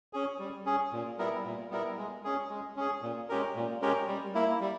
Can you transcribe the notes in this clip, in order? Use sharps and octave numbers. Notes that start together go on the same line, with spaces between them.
C#4 G#4
G3
C#4 G#4
A#2
G3 B3 E4 A#4
A#2
G3 B3 E4 A#4
G#3
C#4 G#4
G#3
C#4 G#4
A#2
G#3 C#4 G4 A#4
A#2
G#3 C#4 G4 A#4
G3
A#3 E4
G3